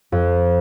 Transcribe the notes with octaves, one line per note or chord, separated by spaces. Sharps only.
F2